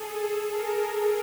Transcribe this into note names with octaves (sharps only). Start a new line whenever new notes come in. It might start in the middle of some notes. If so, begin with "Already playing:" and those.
Already playing: G#4 A4
A4
A#4